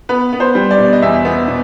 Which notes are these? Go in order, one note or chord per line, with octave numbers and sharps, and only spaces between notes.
B3 B4
B3
C5
G3
D5
B2
D#5
E2 E5
B3
B2